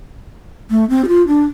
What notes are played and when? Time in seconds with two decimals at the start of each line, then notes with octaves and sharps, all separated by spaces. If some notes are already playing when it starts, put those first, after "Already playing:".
0.70 A3
0.90 C4
1.04 G4
1.08 F4
1.27 D4